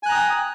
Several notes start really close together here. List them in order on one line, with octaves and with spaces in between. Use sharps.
G#5 F#6 A#5 D#6 G5